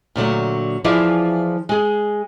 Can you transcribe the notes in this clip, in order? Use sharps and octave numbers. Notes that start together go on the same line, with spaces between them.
A#2 D3 F#3 A3
E3 F3 E4 F4 G#4 D5
G#3 G#4